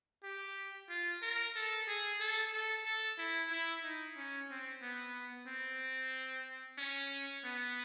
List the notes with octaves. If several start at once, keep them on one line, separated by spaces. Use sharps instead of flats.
G4
F4
A#4
A4
G#4
A4
A4
A4
E4
E4
D#4
C#4
C4
B3
C4
C#4
B3